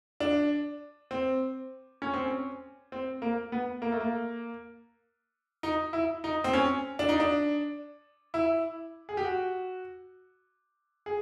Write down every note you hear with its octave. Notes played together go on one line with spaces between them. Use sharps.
D4
C4
C#4
C4
C#4
C4
A#3
B3
A#3
A3
A#3
D#4
E4
D#4
C4
C#4
D4
D#4
D4
E4
G#4
G4
F#4
G#4